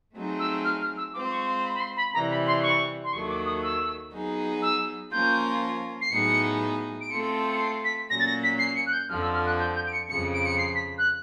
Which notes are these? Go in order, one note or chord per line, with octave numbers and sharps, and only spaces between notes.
F#3 A3 C4 D#4 G#4
E6
F6
F6
E6
G#3 C4 F4 D6
C#6
C6
B5
B5
C6
B5
C3 E3 G3 A#5
B5
C6
C#6
C6
D#2 D#3 F#3 A3 C#6
D6
D#6
E6
F#3 B3 D#4 G#4
E6
F3 A#3 C#4 F4 A#4 G6
C7
A2 F#3 B3 D#4 G#4 C#7
D7
A3 C4 F4 A4 C#7
C#7
C7
B6
A#2 F#3 A#3 C#4 A#6
A6
A#6
B6
C7
C#7
F#6
G6
F2 D3 F3 F6
E6
F6
F#6
G6
G6
D7
C#7
F2 C#3 F3 C#7
D7
C#7
C7
B6
F#6